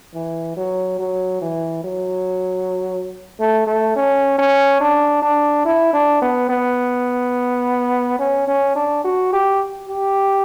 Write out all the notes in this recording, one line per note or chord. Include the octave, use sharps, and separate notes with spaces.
E3
F#3
F#3
E3
F#3
A3
A3
C#4
C#4
D4
D4
E4
D4
B3
B3
C#4
C#4
D4
F#4
G4
G4